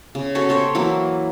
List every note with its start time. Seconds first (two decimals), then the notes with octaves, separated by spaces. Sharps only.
0.15 C#3
0.35 C#4 F#4 A4 C#5
0.49 G4 A4 C5 C#5
0.75 E3 F#3 A#3 E4